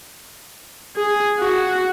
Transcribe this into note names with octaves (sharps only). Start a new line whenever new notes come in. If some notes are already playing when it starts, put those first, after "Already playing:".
G#4
F#4